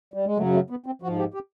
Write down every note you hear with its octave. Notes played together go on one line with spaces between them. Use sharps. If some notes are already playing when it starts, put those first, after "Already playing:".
G3
G#3
F#2 C#3 F#3 A3
A3
B3
C4
F3 F#4
G#2
G4
G4